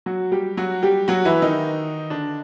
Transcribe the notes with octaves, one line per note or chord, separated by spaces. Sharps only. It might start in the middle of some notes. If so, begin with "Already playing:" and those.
F#3 F#4
G3 G4
F#3 F#4
G3 G4
F#3 F#4
E3 E4
D#3 D#4
D3 D4